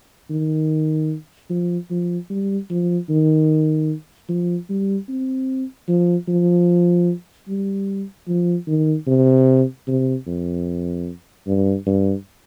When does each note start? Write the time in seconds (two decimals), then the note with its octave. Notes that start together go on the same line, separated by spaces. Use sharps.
0.30 D#3
1.50 F3
1.91 F3
2.30 G3
2.70 F3
3.09 D#3
4.29 F3
4.69 G3
5.09 C4
5.89 F3
6.28 F3
7.48 G3
8.28 F3
8.68 D#3
9.07 C3
9.88 C3
10.27 F2
11.47 G2
11.86 G2